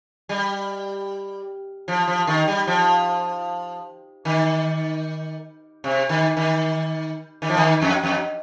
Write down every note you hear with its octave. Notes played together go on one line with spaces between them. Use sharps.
G3
F3
F3
D#3
G3
F3
D#3
C3
D#3
D#3
D#3
F3
D#3
F2
F2